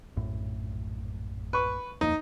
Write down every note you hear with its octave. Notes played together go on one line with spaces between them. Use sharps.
A#1 F#2 A2
B4 C#6
D#1 F2 A#3 D#4